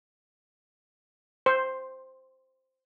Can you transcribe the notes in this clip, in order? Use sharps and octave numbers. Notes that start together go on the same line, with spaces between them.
C5